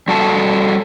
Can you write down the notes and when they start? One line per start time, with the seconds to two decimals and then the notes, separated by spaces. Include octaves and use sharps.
0.08 G3 F#4 A4 A5